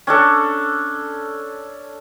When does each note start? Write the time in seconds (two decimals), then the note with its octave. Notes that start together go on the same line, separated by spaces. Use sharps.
0.07 C#4 D4 A4